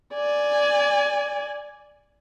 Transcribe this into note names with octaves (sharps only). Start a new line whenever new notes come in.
D5 G#5